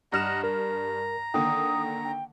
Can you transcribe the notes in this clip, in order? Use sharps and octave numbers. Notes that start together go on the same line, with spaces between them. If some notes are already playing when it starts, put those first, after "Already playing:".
G2 D#5 F#5 A#5 F6 E7
A#4 A#5
D3 D#3 A#3 G5 D#6
G5